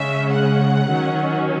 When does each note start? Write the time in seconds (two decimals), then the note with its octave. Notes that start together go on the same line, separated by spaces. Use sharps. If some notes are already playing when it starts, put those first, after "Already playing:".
Already playing: C#3 G#3 C#4 E5
0.32 F#5
0.89 D#3 F#3 C#4